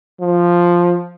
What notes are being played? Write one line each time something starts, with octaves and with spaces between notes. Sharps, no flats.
F3